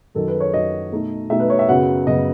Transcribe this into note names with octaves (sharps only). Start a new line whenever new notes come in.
F#2 D#3 F#3 A4
B4
C#5
F#2 D#3 F#3 D#5
B2 A3 D#4
B2 A3 D#4 E5
B4
C#5
E5
F#2 C#3 F#3 B3 F#5
F#2 C#3 F#3 B3 D#5